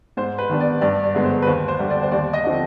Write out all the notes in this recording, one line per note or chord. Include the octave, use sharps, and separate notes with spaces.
G#2 C5
B4
D#3 B3 D4
D5
G2 D5
D5
D3 G#3 B3
C5
B4
D#2 C5
C5
D3 G3 D4
D5
C5
D#2 D5
D#5
D3 F3 C4